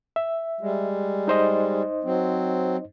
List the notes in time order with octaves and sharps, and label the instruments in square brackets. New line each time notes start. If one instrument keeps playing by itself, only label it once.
[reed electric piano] E5
[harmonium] G3 G#3
[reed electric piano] D#4 C5 D#5
[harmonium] F#3 C4